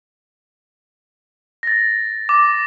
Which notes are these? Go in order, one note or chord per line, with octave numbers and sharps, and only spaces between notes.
A6 A#6
D6